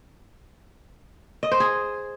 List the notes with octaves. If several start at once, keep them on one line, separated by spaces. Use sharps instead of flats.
D#5
C5
G#4